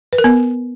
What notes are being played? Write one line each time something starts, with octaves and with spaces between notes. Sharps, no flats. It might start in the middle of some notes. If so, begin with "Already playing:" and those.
B4
A#4
B3